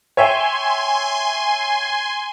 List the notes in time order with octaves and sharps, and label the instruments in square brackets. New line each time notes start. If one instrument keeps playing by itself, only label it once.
[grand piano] C#5 E5 G5 [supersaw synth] G#5 C6